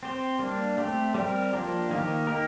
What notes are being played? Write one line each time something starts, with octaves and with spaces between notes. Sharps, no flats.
C4 G4 C5
G3 A#3 D4
A3 C4 G4
G3 C4 G4 A#4
F3 A#3 D4 G4
D#3 A#3 D#4 G4
A#3 D#4 G4 A#4